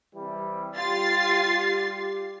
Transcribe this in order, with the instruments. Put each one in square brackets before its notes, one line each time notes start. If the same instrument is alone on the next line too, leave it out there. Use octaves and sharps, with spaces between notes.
[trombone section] C3 E3 G3
[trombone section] G3 G4 [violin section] F4 A6 C7